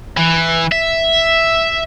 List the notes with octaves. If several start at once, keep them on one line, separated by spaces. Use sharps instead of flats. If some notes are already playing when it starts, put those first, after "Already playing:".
E3
E5